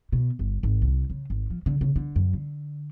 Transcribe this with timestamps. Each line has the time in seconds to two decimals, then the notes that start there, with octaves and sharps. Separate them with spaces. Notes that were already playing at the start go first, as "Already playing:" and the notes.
0.12 B2
0.39 G1
0.63 G#1
0.82 C2
1.10 C#3
1.30 G#1
1.50 F3
1.66 D3
1.81 C#3
1.96 D3
2.16 F#2
2.33 D3